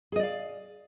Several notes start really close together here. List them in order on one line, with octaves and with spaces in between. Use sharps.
G#4 D#5 D5 F5